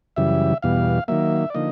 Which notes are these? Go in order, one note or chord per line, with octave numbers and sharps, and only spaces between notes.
F#2 C#3 E3 G3 E5
E2 B2 G3 F5
D#3 F#3 A#3 E5
D5
D3 F3 A#3 D#4 D#5